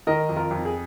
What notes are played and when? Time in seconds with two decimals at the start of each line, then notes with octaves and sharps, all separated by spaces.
0.07 D#3 A#4 D#5
0.29 F2
0.36 F4 A#4
0.51 F2
0.65 G#4